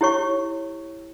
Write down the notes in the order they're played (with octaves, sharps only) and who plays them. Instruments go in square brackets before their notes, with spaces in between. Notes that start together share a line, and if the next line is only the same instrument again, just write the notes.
[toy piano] E4 G4 C#5 C#6